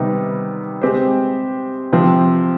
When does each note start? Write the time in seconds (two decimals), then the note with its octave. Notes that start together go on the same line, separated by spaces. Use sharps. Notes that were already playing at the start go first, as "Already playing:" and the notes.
Already playing: C3 D#3 G3 B3 D#4
0.82 G#3 C4 G4 C5
1.92 C3 F3 C4